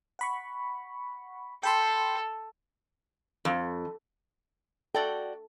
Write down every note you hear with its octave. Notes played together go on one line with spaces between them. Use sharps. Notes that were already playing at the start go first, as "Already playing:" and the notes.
F#5 B5 C#6
A4 G5 B5 C6
F2
F#4 A4 D5 G5